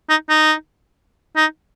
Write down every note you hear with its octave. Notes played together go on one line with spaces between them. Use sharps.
D#4
D#4
D#4